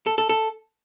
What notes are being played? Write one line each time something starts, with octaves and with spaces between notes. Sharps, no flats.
A4
A4
A4